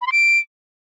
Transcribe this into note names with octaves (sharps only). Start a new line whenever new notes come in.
B5
C6
D7